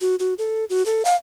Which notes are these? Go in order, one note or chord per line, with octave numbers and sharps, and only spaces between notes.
F#4
F#4
A4
F#4
A4
F5